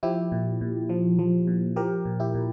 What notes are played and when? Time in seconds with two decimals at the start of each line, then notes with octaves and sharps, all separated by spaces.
0.03 F3 E4 G4
0.32 A#2
0.61 A#2
0.89 F3
1.19 F3
1.47 A#2
1.76 F3 G4 A#4
2.05 A#2
2.20 E4 G4
2.34 A#2